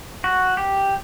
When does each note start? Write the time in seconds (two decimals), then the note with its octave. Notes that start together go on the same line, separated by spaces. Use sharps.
0.24 F#4
0.57 G4